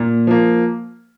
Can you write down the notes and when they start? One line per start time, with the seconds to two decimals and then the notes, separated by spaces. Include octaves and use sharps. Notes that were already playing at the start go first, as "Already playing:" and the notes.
Already playing: A#2
0.27 F3 A#3